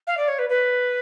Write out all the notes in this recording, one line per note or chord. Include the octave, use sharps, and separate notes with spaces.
F5
D5
C#5
B4
B4